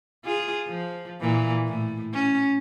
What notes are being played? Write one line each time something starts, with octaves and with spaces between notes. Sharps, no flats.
F4 G#4
F3
A#2 E3
A2
C#4